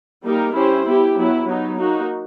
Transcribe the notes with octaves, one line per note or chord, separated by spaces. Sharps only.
G3 A#3 D#4 G4 A#4
C#4 E4 G4 C5
B3 E4 G4
F#3 B3 E4
F#3 B3 D#4
A#3 D#4 F#4